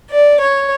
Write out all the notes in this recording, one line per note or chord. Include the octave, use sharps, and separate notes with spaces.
D5
C#5